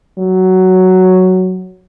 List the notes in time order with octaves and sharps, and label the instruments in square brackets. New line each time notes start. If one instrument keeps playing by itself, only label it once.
[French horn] F#3